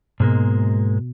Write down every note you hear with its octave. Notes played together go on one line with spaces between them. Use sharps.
G#2 B2 G#3 A#3